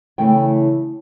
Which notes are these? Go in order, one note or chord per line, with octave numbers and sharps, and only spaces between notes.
C#3 E3 A3 E4 G5